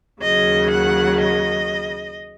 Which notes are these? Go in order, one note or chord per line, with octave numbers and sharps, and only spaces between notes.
D#2 C#3 F#3 D#5
F#5
D#5